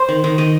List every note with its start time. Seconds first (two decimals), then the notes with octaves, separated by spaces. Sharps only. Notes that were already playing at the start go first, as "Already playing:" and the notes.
Already playing: C5
0.09 D#3
0.24 D#3
0.38 D#3 D#5